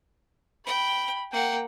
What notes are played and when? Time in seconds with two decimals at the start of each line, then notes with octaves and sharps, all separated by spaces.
0.67 G5 B5
1.33 A#3 F#5 G5